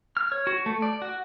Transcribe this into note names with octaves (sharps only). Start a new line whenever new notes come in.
F6
C#5
F#4
A3
D5
F#4